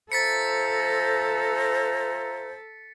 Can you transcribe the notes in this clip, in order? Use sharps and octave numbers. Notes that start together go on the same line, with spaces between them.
F4 A4 C5 E5 A#5 A6 B6 C#7